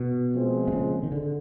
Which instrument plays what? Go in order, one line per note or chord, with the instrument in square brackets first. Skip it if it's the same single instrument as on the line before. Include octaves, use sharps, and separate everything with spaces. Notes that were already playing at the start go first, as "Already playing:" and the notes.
Already playing: [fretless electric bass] B2
[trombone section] A#2 F3 G#3 C4
[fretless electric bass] C3
C#3
D#3
D3